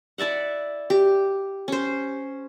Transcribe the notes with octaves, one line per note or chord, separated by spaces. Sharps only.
E4 D5 E5 F#5
G4
C#4 C5